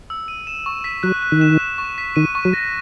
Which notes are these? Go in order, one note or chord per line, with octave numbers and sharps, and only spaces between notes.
E6
D#7
E7
C#6
B6
F#3 F#6
F#6
D#3
E7
E7
C#6
B6
D#3 D#7
C#6
F#3
A#6